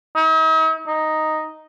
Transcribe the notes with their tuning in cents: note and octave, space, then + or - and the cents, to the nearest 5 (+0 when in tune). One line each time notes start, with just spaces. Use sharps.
D#4 +45
D#4 +0